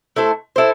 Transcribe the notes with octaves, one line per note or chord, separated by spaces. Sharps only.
A3 E4 A4 C5
E4 A4 C5